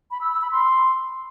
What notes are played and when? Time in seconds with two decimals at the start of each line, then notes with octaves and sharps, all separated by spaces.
0.11 B5
0.21 E6
0.31 E6
0.41 B5
0.52 C6